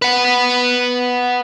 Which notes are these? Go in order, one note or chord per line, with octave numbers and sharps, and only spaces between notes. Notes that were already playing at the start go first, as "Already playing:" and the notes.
B4 F#5